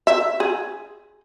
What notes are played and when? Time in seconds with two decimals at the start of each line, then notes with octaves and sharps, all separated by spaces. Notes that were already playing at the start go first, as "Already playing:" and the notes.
0.07 E5
0.40 G#4